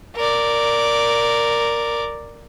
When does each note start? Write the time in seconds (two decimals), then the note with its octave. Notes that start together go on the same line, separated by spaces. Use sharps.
0.16 A#4 D5